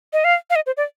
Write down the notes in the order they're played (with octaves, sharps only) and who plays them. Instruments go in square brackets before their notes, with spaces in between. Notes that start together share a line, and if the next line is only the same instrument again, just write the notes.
[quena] D#5
F5
F5
D#5
C5
D5